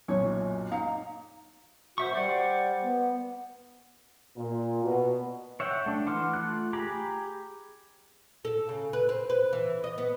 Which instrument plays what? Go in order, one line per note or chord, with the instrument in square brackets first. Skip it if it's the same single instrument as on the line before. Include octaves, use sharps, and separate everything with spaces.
[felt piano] B1 F#2 A#2 [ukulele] C#5
[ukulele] D#4 F5 A#5
[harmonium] F#4 [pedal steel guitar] C5 E5 C#6
[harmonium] G3 [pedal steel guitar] C5 D5 F#5
[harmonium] B3
[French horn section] A#2
B2
[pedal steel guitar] C#5 E5 F#5 G5
A3 D4
E3 F#5 C6 D6 F6
A3 F4 F#6
G4 G#4 A#5 B5 D6
[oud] A4
C#3
B4
C4
B4
E3
D#5
B3